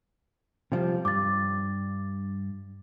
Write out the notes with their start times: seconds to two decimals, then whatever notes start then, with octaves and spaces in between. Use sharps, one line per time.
0.72 C3 F3 G3
1.05 G2 D6 A6